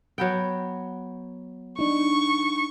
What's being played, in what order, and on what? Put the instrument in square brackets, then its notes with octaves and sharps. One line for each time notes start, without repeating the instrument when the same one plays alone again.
[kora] F#3 B3 G5
[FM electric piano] D4 D#4 [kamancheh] C#6